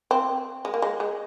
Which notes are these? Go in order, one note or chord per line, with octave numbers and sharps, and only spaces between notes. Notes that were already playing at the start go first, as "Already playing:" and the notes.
C4
G#3
A#3
G#3
G#3